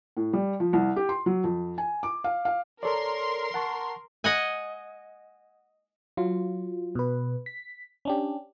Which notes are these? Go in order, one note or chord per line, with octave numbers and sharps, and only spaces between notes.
A2
G3
F3
C2
G4
C6
F#3
F2
G#5
D6
F5
F5
A4 A#4 C#5 D5 C6
F#5 A5 C#6
D#5 F#5 G#5
F#3 F4
B2 B4
B6
C#4 D4 G4